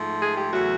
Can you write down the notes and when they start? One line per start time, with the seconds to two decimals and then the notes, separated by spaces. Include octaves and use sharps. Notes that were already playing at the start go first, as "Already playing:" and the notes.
Already playing: G#2 F3 A3
0.22 G#4
0.37 G4
0.51 E2 C#3 F#3 A3 F#4